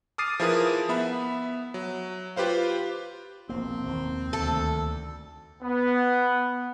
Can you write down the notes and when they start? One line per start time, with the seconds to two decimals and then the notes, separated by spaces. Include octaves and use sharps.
0.18 D6 D#6 F6 A6 C7 D#7
0.40 F3 E4 G#4 A#4 B4 D#6
0.89 B3 E5 B5
1.74 F#3
2.36 F4 G4 B4 C5 F5
3.49 E1 A#1 A#3 C4
3.86 F1 D#2 D#3
4.33 D2 A4
5.63 B3